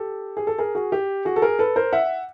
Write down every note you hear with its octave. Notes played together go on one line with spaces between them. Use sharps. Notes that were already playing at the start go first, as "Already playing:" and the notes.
Already playing: G4 A4
G#4
A4
G#4 A#4
F#4 G#4
G4
F#4 G#4
A4
G#4 A#4
A4 B4
A#4 C5
E5 F#5